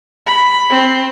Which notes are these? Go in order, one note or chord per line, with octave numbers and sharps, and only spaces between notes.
B5
C4